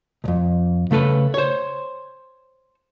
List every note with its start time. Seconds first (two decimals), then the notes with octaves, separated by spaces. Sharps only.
0.24 C2 F2
0.91 C#3 A3 A4 B4
1.34 C5 C#5